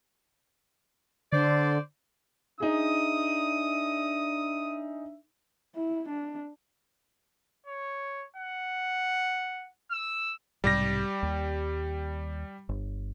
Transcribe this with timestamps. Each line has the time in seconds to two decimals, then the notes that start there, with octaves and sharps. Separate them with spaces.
1.33 D3 C5 D5
2.60 D4 D#4 G#4 E5 D#6
5.75 E4
6.08 D4
7.66 C#5
8.36 F#5
9.91 E6
10.64 B1 G#2 C3 G3 G4 A#6
11.23 D#2
12.69 G1